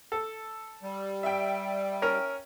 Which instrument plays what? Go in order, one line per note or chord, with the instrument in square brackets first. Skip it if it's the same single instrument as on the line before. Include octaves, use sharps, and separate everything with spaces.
[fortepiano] A4
[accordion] G3
[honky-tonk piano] E5 G5
[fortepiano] C#4 A#4